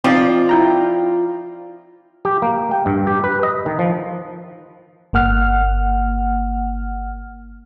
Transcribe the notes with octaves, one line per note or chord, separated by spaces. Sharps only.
F3 C4 D#4 F4 D5
E4 G5 A#5
G4
A#3
G5
G2
G4
B4
D#5
D#3
F3
G1 A#3 F#5 F6